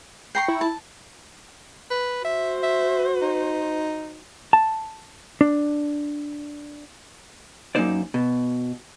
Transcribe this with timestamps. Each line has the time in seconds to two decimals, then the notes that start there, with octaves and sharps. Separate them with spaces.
0.35 G5 A#5 C#6 C7
0.48 E4
0.61 A5
1.90 B4
2.25 F#4 C5 E5
2.63 E5
3.22 D#4
4.53 A5
5.41 D4
7.75 F#2 C3 A#3 D#4 C5 D5
8.14 B2